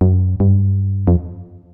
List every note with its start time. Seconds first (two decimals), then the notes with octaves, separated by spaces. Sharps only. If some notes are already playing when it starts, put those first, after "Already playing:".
0.01 F#2
0.40 G2
1.07 F2